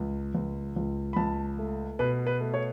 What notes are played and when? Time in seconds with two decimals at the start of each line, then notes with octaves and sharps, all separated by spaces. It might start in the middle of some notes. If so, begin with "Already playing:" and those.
Already playing: C#2
0.35 C#2
0.76 C#2
1.13 B5
1.17 C#2 A5
1.58 A3
1.99 B2 B4
2.26 B4
2.40 A3
2.54 C#5